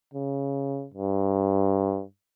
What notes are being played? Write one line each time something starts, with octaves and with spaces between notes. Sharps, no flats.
C#3
G2